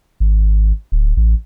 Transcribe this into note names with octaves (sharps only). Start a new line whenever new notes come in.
G#1
D1
A1